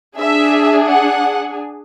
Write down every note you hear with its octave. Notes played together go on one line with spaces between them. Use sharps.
D4 G#4 E5
F#5